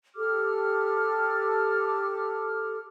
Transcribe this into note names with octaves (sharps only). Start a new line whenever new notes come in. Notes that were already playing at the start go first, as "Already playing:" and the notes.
G4 A4 D6 F6